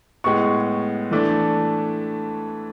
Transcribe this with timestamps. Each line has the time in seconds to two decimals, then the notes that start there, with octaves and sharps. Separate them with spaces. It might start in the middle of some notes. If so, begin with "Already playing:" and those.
0.24 A2 G#3 B3 C#6
1.11 E3 A3 D4